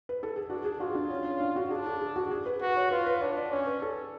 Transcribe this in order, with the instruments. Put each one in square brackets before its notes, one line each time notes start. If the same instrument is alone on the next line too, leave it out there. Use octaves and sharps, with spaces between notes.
[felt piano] B4
A4
G#4
[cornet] D4 [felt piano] F#4
[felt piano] G#4
[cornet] F4 [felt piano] F#4
[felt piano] D4
C#4
C#4
D4
F#4
[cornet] D4 [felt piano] G#4
[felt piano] A4
G#4
F#4
G#4
B4
[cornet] F#4 [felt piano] B4
[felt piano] C#5
[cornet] F4 [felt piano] B4
[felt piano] B4
[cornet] D4 [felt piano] C#5
[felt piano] D5
[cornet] C#4 [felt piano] C#5
[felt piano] B4
A4